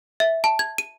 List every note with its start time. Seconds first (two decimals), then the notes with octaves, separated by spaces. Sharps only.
0.20 E5
0.44 A5
0.59 G#6
0.78 D#7